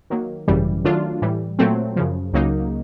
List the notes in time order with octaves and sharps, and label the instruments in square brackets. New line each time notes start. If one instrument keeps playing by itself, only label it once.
[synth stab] D#3 F#3 A#3
G#1 F#2 C#3 E3 G3
D#3 F#3 A3 D4 F4
A2 E3 G3
A#2 F#3 A3 C4
F#2 C#3 F3
C#2 C#3 F#3 A#3 D#4